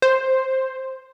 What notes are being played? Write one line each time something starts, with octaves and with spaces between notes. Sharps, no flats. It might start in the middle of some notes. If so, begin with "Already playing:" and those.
C5